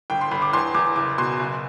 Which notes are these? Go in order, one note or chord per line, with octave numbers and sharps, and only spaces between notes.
G1 G5
C6
G1 B5
D6
E2 C6
E2 D6
F#1 D6
B2 C6
F#1